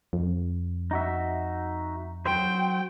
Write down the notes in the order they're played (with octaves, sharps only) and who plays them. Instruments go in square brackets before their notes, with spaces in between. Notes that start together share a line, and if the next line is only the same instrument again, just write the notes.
[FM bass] F2
[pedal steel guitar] D#4 F#4 E5
[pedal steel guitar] F#3 C5 [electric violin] G5